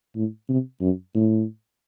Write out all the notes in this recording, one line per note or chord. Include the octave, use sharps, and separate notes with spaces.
A2
C3
F#2
A2